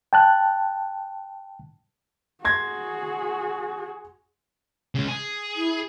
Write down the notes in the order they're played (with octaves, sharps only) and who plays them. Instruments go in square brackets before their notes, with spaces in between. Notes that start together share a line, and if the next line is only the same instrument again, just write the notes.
[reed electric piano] G5 A5 F#6
[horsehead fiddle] F#4 G#4 [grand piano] C6 G#6 A#6
[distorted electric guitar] C#3 G#3
G#4
[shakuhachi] E4